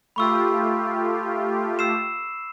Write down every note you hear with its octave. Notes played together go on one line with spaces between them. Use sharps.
A3 F4 G4 B5 C#6 E6
E6 C7 E7